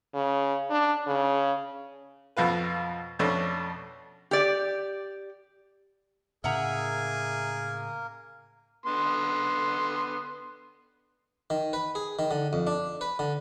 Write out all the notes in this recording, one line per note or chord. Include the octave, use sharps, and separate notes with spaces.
C#3
D4
C#3
F2 B2 F4 B4
F2 B2 A3 C#4 D4
G4 D5
A2 C#3 A#3 G#4 A#4 E5 F#5 A#5
D3 B3 C6
D#3
B4
G#4
D#3
D3
F2
D4
B4
D3